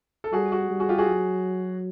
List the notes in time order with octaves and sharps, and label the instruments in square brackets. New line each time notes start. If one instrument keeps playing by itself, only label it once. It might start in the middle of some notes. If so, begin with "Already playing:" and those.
[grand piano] A4
[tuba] G3 [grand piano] F#4 G#4
[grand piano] F#4 G#4
[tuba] G3
[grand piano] F#4 G#4
F4 G4
F#4 G#4
[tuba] F#3